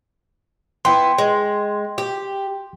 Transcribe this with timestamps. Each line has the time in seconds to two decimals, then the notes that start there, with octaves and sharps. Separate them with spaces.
0.85 B3 E4 G5 C6
1.18 G#3
1.98 G4